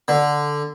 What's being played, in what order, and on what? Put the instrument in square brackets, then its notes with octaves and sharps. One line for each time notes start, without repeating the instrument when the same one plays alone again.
[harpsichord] D3